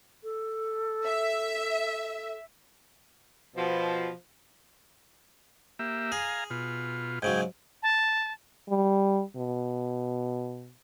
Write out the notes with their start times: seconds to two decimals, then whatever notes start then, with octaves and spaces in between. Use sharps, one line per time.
0.24 A4
1.06 E5
3.57 B2 F3
5.79 A#3 G4 E5
6.12 G#4 F5 G#5 A#5
6.50 B2 F4
7.22 G#2 C#3 F#3 G#4 G5
7.83 A5
8.69 G3
9.36 B2